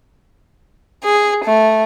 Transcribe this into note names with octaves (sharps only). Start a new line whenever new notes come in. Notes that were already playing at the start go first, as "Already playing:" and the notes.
G#4
A3